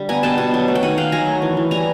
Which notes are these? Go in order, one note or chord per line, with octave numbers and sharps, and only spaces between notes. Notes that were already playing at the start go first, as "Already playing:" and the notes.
Already playing: D3 G3
B3 G#5 A#5
B2 G5 A5
B2
F#3
A3
G5
D#3 F#5 G#5
D#3 F5 G5
F#3 G#5 A#5
A3
E3
E3
G3 G#5 A#5